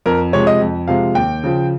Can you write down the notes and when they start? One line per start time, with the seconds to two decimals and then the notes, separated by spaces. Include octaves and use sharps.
0.06 F2 A#4
0.33 C3 F3 G#3 C#5
0.47 D#5
0.61 F2
0.88 C3 F3 G#3 F5
1.15 D#2 G5
1.44 C#3 F3